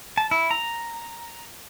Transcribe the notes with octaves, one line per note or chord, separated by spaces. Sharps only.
A5
E4
A#5